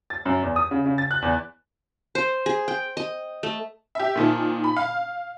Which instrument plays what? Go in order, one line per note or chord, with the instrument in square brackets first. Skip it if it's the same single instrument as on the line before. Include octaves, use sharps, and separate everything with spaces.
[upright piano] A6
F#2
E2
D#6
C#3
C#3
A6
F#6
E2
[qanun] C5
G#4
G5
D#5
A3
[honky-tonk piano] G4 E5
A#2 D#3 F3
B5
F5 F6